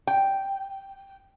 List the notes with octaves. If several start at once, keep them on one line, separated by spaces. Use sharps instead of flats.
G5